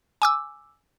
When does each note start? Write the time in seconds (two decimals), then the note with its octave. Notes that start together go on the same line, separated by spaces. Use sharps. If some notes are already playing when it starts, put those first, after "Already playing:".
0.22 G#5 D6 E6